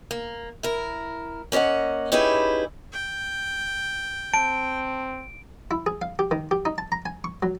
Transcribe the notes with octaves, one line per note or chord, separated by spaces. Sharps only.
A#3
E4 A#4
A#3 C#4 A#4 D#5 F#5
C#4 D#4 E4 G4 G#4 B4
G5
C4 A5 D7
E4
G#4
F5
G4
D#3
G4
D#4
A5
A#5
G#5
C#6
F#3